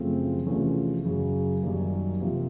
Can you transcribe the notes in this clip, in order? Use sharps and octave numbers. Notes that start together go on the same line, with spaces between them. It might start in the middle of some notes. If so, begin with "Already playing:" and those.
Already playing: F#2 C#3 F3 A3 C4
E2 C3 F3 A3 C#4
F#2 C#3 F#3
F#2 D#3 G3 A#3
C3 F3 A#3